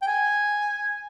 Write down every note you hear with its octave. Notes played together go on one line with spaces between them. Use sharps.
G5
G#5